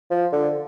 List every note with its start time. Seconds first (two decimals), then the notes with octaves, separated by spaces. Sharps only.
0.10 F3
0.32 D3